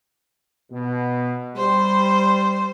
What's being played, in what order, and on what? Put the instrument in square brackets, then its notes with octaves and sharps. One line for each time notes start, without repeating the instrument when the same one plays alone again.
[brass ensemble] B2
[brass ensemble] G3 [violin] C5